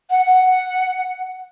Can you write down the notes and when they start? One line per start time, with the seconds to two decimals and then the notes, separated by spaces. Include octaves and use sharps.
0.10 F#5
0.26 F#5